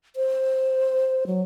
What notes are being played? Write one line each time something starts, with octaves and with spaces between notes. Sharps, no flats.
C5
F#3